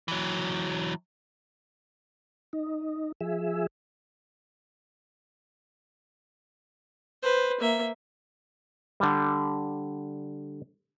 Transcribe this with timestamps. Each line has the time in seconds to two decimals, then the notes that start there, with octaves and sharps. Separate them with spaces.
0.08 E3 F#3
2.53 D#4
3.21 F3 G#4 E5
7.23 B4 C5
7.60 A#3 E5
9.00 D3 G3